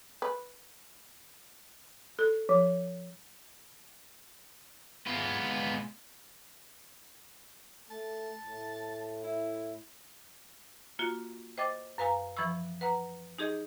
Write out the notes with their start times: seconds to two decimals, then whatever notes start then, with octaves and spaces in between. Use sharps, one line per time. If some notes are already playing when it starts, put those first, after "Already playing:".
0.22 B4
2.19 A4
2.49 F3
5.07 G#3 B3 F4 B4
7.91 A3 A5
8.45 A2
9.24 E4
10.99 A#3 F4 F#4
11.58 C5 D#5 G5 D6 A6
11.98 F#2 B4 F5 G#5 A#5
12.37 E3 F3 B5 C#6 E6
12.81 B4 F#5 A#5
13.39 D#4 G4 G#4 D#5